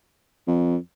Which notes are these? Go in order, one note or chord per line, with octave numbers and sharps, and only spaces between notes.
F2